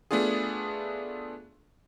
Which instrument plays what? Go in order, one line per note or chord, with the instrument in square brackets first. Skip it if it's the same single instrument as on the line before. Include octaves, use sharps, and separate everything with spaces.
[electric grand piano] A3 B3 D4 F4 G#4